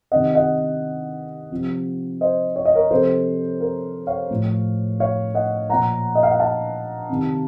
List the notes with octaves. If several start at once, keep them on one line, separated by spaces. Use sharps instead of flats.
C3 D#3 D#5 F#5
D#5 F#5
C3 F3
C5 D#5
C#5
D#5
A#4 C#5
C3 F3 A4 C5
A#4
C#5 F5
A2 F3
C#5 F5
D#5 F#5
A#2 F3 F#5 A#5
D#5
F5
F#5
F5 A5
C3 D#3